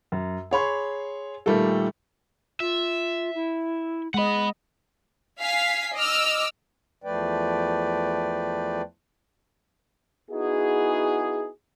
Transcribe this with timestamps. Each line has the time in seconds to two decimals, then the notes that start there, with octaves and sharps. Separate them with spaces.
0.12 F#2
0.51 G#4 C#5 B5 C6
1.46 A#2 D#3 G3 A3 A#3 A4
2.60 F4 E5
3.35 E4
4.14 G#3 D#5 F#5 B5
5.40 F5 G#5 B6 C7
5.96 D#5 D6 E6 F6
7.04 E2 F3 A3 B4 D5 G5
10.31 B3 D#4 E4 F#4 G#4